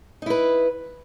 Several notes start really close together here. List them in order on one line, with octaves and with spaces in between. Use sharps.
D#4 E4 B4